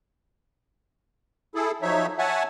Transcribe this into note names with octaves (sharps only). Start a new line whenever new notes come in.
E4 G#4 A4
F3 F#3 D#4 C#5 E5
C#5 E5 F#5 G#5 A5